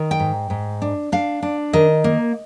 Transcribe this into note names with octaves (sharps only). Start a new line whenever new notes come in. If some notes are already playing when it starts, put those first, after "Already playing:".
Already playing: D#3
G5
G#2
G#2
D4
D4 F5
D4
D#3 D#5
A#3